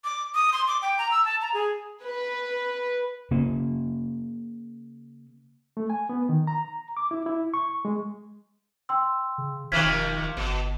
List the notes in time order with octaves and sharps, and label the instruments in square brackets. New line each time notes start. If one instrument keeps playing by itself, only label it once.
[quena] D6
D#6
C6
D6
G5
A#5
E6
A5
A#5
G#4
[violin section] B4
[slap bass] C#3 A#3 C#4
[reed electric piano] A3
G#5
B3
D#3
A#5
D6
E4
E4
C#6
G#3
[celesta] G5 C6 E6
[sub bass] C#3
[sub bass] E1 [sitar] C3 D#3 F3 [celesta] F6 G#6 B6
[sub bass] G1 [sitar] B2